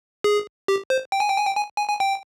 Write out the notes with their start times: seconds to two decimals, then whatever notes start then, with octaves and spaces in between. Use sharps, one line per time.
0.24 G#4
0.68 G4
0.90 C5
1.12 G5
1.20 G#5
1.29 G5
1.37 G#5
1.46 G5
1.56 G#5
1.78 G#5
1.89 G#5
2.00 G5